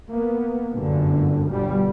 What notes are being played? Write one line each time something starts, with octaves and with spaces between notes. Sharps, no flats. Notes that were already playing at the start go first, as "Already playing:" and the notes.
A#3 B3
G1 F#2 A2 D3
G1 B2 G3